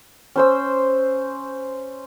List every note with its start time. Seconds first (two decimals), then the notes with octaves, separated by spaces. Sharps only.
0.36 C#4 C5 E6